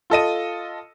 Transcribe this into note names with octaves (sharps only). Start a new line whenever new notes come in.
F4 A4 D#5 D#7